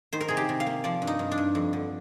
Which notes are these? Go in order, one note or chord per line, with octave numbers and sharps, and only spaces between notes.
D#3 C5
A#4
C3 G#4
G4
C3
F5
A#3
F3 D5
G2
D#4
G2
D4
G2
F2
D3